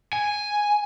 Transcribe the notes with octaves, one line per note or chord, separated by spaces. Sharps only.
G#5